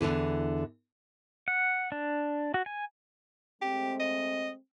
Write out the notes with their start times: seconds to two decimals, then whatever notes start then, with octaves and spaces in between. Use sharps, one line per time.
0.01 E2 A2 D3 E3
1.48 F#5
1.92 D4
2.54 F#4
2.66 G#5
3.62 G#3 A3 C4 G4
4.00 D#5